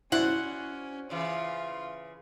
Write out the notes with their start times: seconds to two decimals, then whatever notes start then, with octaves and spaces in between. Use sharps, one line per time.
0.12 C#4 E4 F#4 C5 D5 F#5
1.10 C#3 E3 F4